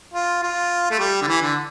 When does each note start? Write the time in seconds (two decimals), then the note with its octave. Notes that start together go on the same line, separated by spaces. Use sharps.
0.13 F4
0.43 F4
0.91 A3
0.99 G3
1.22 D3
1.27 E3
1.42 D3